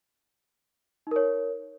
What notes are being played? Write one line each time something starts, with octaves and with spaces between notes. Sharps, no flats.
D#4 A#4 C#5